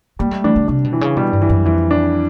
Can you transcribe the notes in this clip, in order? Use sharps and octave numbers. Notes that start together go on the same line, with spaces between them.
G3 A#3
A3
E3 D4
D3
C3 D4
B2
E3
C#3
B2 G3
G2
E3
F#2
F2 E3
D4